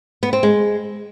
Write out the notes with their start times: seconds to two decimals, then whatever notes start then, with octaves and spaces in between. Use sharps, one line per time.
0.23 B3
0.33 C4
0.43 G#3